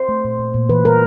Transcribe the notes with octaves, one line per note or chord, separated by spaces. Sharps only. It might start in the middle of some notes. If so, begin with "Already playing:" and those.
Already playing: C5
A3
A#2
A#2
A#2
E3 B4
G3 A#4